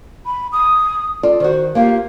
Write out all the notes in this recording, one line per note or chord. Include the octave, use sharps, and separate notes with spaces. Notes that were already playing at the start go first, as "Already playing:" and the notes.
B5
D#6
F4 A4 D5
D#3 F#4 C5
A#3 F4 G4 F5